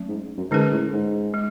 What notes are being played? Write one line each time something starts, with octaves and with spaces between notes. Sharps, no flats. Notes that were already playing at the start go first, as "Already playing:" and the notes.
Already playing: F#3 A3 C#4
G#2
F#2
G#2 D3 G#3 C#4 G#4 B4
A2
G#2
G#3